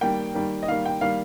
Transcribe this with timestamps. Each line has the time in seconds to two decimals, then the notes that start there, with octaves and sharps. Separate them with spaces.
0.01 D#3 G3 A#3 G5
0.34 D#3 G3 A#3
0.63 D#5
0.68 D#3 G3 A#3 F5
0.86 G5
1.01 D#3 G3 A#3 F5